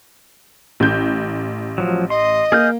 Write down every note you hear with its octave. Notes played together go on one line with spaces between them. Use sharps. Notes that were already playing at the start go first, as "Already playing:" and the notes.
A1 G6
F3 F#3
D#5 C6
A#3 G#4 F6 G6